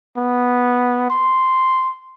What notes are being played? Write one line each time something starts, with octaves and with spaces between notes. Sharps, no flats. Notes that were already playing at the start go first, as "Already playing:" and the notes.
B3
C6